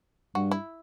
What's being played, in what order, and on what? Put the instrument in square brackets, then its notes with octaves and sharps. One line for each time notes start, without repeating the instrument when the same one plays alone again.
[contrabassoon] G2 [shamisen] F#4
[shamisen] E4